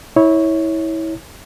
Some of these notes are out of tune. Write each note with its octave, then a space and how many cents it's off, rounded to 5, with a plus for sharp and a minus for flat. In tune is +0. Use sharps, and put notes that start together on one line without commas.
E4 -25 C#5 +0